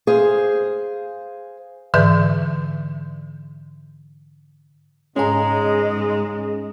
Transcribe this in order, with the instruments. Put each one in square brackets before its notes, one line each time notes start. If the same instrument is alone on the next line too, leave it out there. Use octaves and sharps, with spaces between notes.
[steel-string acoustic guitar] G#4 C5 F5
[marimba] G#2 D3 E3 B4 E5 G6
[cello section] G#2 D#5 [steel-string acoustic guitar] C#3 A#5 [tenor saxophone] G#3 [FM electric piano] C#4 G#4